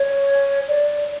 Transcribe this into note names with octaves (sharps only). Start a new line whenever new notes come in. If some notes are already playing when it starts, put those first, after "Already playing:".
Already playing: C#5
D5